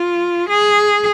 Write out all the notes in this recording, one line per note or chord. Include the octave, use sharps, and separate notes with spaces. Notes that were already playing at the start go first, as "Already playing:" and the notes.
Already playing: F4
G#4